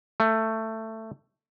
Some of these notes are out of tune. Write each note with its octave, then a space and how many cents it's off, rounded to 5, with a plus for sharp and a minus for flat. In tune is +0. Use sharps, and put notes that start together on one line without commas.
A3 +15